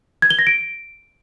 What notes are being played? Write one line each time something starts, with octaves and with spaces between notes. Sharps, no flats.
G#6
G7
A#6
D7